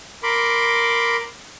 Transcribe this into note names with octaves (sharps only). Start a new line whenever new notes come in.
A#4 B5 C6 D6